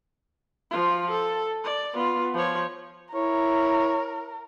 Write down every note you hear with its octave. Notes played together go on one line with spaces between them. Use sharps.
F3 F4
A4
D5
B3 F4
F3 C#5
E4 A#4 C#5